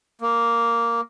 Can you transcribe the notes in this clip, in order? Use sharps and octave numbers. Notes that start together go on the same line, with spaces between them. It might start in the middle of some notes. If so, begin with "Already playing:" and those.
A#3